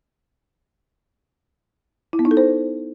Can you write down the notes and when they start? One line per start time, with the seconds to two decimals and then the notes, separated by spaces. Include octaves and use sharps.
2.13 E4
2.19 B3
2.25 D#4
2.31 A4
2.37 C5